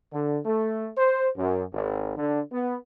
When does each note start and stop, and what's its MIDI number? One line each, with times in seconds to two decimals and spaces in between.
0.13 0.39 50
0.46 0.89 57
0.97 1.29 72
1.37 1.64 42
1.73 2.14 32
2.17 2.40 50
2.52 2.77 59